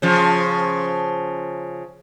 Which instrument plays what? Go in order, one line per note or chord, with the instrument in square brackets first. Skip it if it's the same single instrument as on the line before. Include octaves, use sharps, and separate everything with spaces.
[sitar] C#3 F3